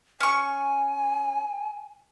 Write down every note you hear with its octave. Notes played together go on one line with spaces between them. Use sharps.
C#4 G#5 C#6